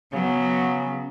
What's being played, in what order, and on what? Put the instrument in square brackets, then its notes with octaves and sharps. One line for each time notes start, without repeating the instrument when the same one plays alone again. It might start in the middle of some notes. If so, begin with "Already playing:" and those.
[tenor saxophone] C#3 [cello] F#3 B3